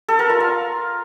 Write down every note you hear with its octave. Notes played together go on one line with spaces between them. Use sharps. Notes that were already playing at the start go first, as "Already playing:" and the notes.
A4
A#4
F4
F5